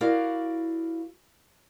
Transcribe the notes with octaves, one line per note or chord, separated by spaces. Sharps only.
E4 F#4 A#4 D5 F5